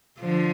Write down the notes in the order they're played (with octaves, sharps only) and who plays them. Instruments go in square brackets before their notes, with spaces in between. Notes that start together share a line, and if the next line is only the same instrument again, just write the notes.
[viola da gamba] D3 F3